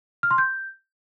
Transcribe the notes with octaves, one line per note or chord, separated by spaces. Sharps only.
F6
C6
G6